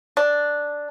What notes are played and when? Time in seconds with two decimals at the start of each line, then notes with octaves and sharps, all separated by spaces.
0.17 D4